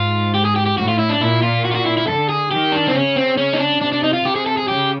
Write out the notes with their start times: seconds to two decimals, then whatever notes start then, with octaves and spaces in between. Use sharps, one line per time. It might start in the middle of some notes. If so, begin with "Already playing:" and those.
Already playing: G#2 F4
0.34 G4
0.45 G#4
0.56 G4
0.66 G4
0.78 A2 F#4
0.88 F4
0.99 E4
1.09 D4
1.21 A#2 E4
1.42 F4
1.65 F#4
1.71 F4
1.75 F#4
1.86 E4
1.97 E4
2.07 D3 A4
2.29 G#4
2.51 D#3 G4
2.72 D4
2.88 C4
2.94 C#3 C#4
3.16 C4
3.37 C#4
3.53 D#4
3.59 D4
3.81 C3 D4
3.92 D4
4.04 D#4
4.13 F4
4.25 C3 G4
4.36 G#4
4.46 A4
4.57 G#4
4.67 C#3 G4